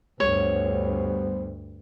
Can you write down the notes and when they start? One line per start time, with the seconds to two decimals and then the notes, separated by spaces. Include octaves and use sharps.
0.20 D2 G2 G3 B3 C5 C#5